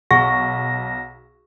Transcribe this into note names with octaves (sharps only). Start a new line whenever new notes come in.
B1 G#4 F#5 C#6 A#6